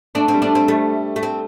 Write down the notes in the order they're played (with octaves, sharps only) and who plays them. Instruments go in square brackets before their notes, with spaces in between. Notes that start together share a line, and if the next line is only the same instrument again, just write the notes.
[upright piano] A3 [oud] D4
[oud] C4
[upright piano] G3
[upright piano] A3 [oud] D4
[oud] C4
[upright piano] G3 [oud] A3
[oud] A3
C4